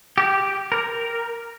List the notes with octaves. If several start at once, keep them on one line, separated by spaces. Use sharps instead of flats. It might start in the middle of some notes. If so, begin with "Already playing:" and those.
G4
A#4